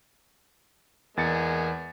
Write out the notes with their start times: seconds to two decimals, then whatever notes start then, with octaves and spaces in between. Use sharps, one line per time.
1.17 E2 G#3 A#3 A6 C#7